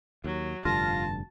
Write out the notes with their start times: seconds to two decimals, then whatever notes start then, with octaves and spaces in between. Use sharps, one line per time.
0.24 D#2 F#3
0.65 F1 G2 D3 F4 A5 A#6